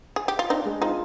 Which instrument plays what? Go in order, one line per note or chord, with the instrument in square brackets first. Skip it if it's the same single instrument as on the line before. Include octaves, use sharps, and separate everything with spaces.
[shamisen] G#4
G4
F4
[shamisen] C4 D#4 [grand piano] D4
[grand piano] G#3
[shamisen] C4 D#4 [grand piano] F4